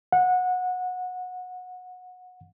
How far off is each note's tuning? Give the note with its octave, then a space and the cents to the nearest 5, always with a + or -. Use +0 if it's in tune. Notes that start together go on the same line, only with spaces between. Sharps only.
F#5 -20